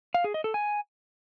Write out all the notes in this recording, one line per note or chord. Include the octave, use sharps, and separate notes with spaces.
F5
G#4
D#5
A4
G#5